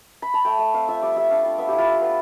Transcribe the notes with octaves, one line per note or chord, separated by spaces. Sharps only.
B5
A5
A3 G5
A3
C4 F5
F4 E5
G3 D5
G3 E5
D4 F5
F4 G5
B3 E5
E4 G4
F4
E4
B3